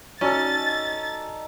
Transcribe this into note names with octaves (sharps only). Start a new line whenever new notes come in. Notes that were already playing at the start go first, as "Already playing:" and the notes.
C#4 D#4 F#4 A4 D5 G#5 A6